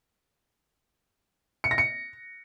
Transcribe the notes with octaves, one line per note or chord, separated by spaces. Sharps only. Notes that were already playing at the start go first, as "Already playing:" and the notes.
C#7
A#6
C#7